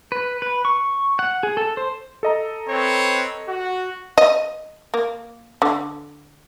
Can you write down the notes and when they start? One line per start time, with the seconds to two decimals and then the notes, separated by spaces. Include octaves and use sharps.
0.12 B4
0.42 B4
0.65 C#6
1.19 F#5
1.43 G#4
1.57 A4
1.77 C5
2.23 A4 D#5 A#5
2.69 C4 B4 C#5
3.49 F#4
4.18 D#5
4.94 A#3
5.62 D3